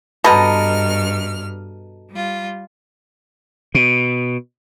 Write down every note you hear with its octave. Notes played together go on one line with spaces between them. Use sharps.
G2 B2 A4 D#5 A#5 F6
G3 F4
B2